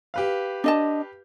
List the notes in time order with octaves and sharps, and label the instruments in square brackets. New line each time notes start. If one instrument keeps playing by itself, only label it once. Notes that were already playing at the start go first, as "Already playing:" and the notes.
[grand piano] G4 B4 F5
[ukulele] D4 D#5 A5